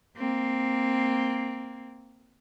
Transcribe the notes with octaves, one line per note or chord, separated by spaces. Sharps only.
A#3 C4